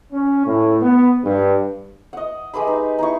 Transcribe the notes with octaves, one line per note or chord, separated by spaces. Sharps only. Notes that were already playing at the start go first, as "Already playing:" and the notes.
C#4
A2
B3
G2
D#5 F#5
G#3 G4 B4 B5
D#4
D#4 E4 C#6